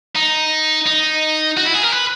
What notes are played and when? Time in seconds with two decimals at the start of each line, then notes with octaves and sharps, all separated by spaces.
0.16 D#4
0.86 D#4
1.57 F#4
1.65 E4
1.74 G#4
1.83 A#4
1.92 B4